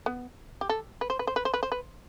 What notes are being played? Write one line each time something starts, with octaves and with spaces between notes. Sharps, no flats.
B3
G4
A4
B4
C5
B4
C5
B4
C5
B4
C5
B4